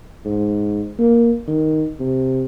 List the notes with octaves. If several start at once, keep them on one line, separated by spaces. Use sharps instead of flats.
G#2
A#3
D#3
C3